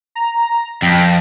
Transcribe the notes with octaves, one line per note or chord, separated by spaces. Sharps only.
A#5
F2 G5